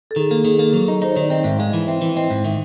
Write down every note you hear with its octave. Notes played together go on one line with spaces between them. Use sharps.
A4
D#3 G#4
A#3
D#3 G#4
A#3 A4
F#3
D#4
D#4 C5
C#5
D#3 D5
C4 D#5
G#2 E5
G#3 F5
E3
C4 E5
E3
C4 D#5
G#2
D#3 E5